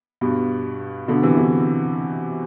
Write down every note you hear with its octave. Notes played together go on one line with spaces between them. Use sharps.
G2 B2
B2 D3
C3 E3
B2 D3